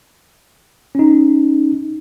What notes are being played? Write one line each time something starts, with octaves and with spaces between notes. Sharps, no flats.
C#4 D#4